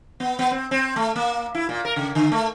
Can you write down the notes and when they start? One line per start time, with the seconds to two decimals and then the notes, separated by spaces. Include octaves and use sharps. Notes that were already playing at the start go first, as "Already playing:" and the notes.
0.20 B3
0.39 B3
0.51 C4
0.71 C4
0.96 A3
1.16 A#3
1.55 E4
1.69 A#2
1.85 A#4
1.96 C#3
2.15 D3
2.32 A3